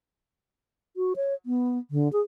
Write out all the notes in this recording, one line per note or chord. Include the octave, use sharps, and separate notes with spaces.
F#4
C#5
B3
D3
G#4